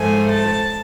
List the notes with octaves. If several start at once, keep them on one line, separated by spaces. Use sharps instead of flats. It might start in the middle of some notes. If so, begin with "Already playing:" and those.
Already playing: G#2 F3 A3 G#5
A5